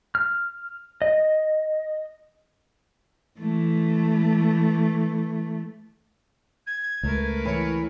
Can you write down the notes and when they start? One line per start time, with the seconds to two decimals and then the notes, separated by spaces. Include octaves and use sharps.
0.15 F6
1.02 D#5
3.40 E3 A3
6.66 G#6
7.03 C#2 A3 A#4 B4
7.45 E3 C#5